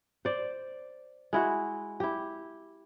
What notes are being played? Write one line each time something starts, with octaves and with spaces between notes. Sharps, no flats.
C5 D5
G#3 E4 F#4
E4 G4